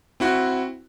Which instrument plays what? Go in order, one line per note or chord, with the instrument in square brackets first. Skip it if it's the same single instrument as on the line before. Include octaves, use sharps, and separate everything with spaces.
[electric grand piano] C4 E4 F#4